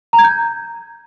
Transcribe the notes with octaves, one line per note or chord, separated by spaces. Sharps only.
A#5
G#6
G6